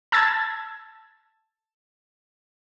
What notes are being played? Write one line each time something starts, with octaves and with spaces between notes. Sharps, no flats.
A5 E6 G#6 A6